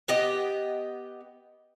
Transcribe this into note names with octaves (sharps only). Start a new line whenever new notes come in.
B3 G4 D#5